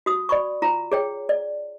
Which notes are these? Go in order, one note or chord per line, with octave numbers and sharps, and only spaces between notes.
F#4 D#6
D5 B5 C#6
F4 A#5
G#4 C#5 G5
D5